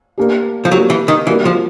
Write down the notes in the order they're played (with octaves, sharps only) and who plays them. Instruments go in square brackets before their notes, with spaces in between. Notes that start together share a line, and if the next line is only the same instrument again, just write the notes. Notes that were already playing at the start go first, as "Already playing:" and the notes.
[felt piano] A#3 D4 G4
[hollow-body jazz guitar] F3
[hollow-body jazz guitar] F#3 [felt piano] A#3 D4 G4
[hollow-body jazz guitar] E3
D#3
[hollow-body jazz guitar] E3 [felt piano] G3 A#3 D4 F#4 A#4
[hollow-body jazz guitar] F3